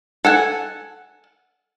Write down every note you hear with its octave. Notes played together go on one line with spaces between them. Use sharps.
A4 F#5 G#5